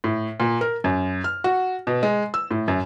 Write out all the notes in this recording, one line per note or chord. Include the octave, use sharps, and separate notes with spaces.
A2
A#2
A#4
F#2
F6
F#4
B2
G#3
E6
A2
F#2